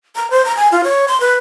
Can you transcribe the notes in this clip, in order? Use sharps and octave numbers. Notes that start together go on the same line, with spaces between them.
A#5
C5
A#5
G#5
F4
C#5
C6
B4